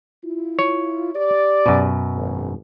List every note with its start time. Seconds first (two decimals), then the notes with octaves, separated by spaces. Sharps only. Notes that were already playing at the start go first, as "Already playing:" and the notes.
0.24 E4 F4
0.59 C#5
1.16 G4 D5
1.66 F#2 B2
2.15 G#1